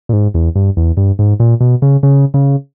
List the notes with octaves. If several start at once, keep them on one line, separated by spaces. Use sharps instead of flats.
A#2
G#2
E2
G2
E2
G2
G#2
A#2
B2
C#3
C#3
C#3